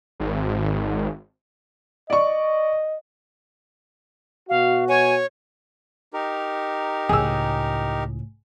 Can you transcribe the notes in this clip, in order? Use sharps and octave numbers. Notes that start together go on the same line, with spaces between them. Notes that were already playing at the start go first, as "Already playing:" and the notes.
G#1
D5 D#5 C#6
B2 F#4 F5
C#5 G#5
D#4 G4 A#4
C#2 A2 G#4 E6